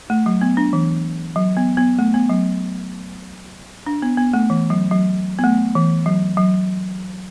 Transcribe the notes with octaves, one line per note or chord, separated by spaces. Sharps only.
A3
F#3
B3
D4
E3
F#3
B3
B3
A3
B3
F#3
D4
B3
B3
A3
E3
F#3
F#3
B3
A3
E3
F#3
F#3